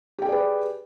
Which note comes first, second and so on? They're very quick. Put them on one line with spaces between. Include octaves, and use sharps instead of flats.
G4 G5 G#4 D5 B4